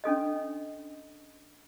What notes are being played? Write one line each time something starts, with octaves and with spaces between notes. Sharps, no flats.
C#4 D4 A4 D#5